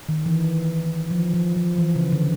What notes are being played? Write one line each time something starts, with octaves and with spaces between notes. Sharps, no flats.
D#3
E3
F3
F3
F3
E3
C#3
D3